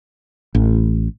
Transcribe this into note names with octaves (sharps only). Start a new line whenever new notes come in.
A1